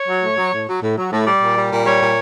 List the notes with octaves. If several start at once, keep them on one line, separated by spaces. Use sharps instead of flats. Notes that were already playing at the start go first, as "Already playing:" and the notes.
Already playing: C#5
F#3
A2
F#3
A2
F#3
A2
F#3
A2
G3 D5
A#2
G3
A#2
G3 C#5
A#2